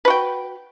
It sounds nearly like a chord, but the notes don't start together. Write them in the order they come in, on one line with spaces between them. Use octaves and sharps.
B4 F#4 G5